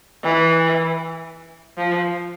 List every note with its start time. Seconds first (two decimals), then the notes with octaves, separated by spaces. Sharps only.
0.23 E3
1.78 F3